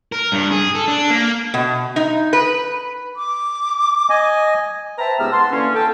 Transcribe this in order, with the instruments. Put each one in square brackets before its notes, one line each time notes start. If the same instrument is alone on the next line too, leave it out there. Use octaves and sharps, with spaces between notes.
[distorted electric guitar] A#4
G2
G#4
A4
D4
A#3
[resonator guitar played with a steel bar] B2
D#4
B4
[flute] D6
[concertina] D#5 G#5
[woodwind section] B4 C5 E5 G5 A5 A#5
C#2 G#2 B3 G4 E6 F6
B4 F#5 A5 C6
D3 E3 A#3 C#4
A4 G5 A5